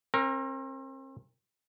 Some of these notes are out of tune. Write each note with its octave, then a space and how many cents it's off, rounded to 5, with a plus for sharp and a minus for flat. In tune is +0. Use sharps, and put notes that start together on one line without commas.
C4 +40 A#4 +0